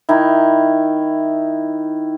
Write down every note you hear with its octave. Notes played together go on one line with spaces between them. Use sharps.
D#3 E4